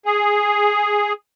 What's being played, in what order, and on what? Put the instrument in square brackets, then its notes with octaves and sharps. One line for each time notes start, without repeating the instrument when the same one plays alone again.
[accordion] G#4